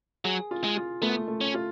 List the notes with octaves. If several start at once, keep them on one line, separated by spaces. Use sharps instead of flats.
F#3 G#4
F4
G#3
F4
A3 B3
A3
C#4
F4